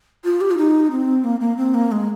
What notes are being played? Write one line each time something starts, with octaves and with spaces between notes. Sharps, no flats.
F4
G4
F4
D#4
C4
A#3
A#3
C4
A#3
G#3